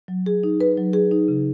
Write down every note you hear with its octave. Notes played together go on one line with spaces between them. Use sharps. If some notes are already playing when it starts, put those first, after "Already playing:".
F#3
G#4
D#4
B4
F#3
G#4
D#4
C#3